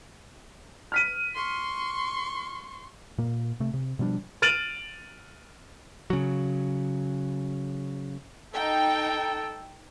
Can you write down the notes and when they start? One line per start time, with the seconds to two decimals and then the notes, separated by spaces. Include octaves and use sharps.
0.92 F6 B6 D#7
1.35 C6 C#6
3.18 A#2 A#3
3.60 C3 A3
3.74 C3
3.99 B2 F3 G3 D4
4.42 F6 A6 D7 D#7 F7 F#7
6.10 C#3 F#3
8.54 D#4 A4 G5